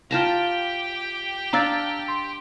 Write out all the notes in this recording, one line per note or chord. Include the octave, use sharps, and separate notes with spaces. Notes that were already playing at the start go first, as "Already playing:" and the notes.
F4 G4 G5 A5 A#5
D4 D5 F5 A#5 E6 A6
C6